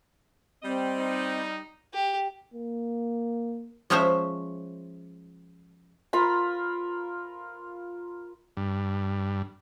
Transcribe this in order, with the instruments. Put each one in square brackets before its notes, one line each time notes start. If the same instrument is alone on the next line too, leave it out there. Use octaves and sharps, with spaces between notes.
[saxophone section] G3 D#5 [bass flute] C4
[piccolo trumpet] D#4
[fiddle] G4
[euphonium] A#3
[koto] F3 G#3 C#4 C5 C#5 E5
[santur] F4 A#4 B5
[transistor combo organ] G2